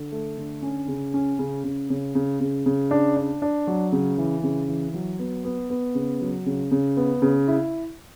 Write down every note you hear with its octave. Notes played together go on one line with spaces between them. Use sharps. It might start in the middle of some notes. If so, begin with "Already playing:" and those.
Already playing: D3
A3
D3
C#4
C#3
C#4
C#3
C#3
C#3
C#3
C#3
C#3
D4
D4
D4
F#3
C#3
E3
C#3
E3
F#3
B3
B3
B3
C#3
F#3
C#3
C#3
B3
C#3
E4